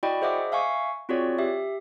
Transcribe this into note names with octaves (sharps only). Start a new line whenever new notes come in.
E4 F#4 D5 D#5 G5 B5
G#4 C5 D#5 E5 F#5 D6
E5 F5 G#5 C#6
C4 F4 F#4 G#4 C#5 D5
G4 E5